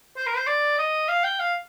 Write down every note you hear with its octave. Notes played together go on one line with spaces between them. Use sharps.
C5
A#4
C5
D5
D#5
F5
G5
F5